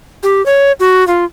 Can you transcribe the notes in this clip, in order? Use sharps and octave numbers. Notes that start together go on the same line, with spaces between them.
G4
C#5
F#4
F4